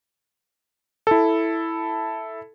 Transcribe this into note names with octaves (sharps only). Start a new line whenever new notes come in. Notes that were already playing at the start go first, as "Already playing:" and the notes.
E4 A4